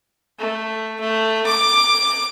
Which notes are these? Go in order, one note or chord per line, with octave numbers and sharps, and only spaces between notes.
A3
A3
D6